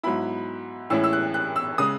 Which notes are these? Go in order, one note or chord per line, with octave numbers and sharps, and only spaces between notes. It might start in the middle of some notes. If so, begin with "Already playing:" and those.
G#2 F#3 B3 E4 B5
A2 E3 G#3 C#4 E4 E6
E6
F#6
F#6
E6
C#3 G#3 D#6